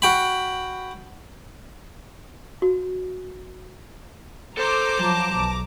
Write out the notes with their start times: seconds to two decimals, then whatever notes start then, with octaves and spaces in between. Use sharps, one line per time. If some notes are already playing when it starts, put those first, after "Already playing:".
0.02 F#4 G5 B5
2.62 F#4
4.57 A4 C5 A#5 D6
5.00 F3 F#3 A5
5.35 B1